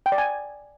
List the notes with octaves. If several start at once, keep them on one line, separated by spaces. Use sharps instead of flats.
G5
D5
G#5